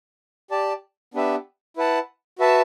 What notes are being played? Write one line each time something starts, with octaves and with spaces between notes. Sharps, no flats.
G4 D5 A5
B3 D4 G4 B4 E5
E4 B4 F#5 A5
F#4 B4 E5 A5